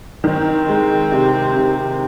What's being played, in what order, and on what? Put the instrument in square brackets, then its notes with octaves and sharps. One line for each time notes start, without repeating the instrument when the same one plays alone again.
[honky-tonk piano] D#3 [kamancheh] C4
[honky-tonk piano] G#3
C3
C3